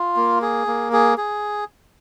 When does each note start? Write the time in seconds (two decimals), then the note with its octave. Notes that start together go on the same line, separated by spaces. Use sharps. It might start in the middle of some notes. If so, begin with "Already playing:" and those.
Already playing: F4
0.16 A#3
0.42 G#4
0.67 A#3
0.93 G#4
1.18 G#4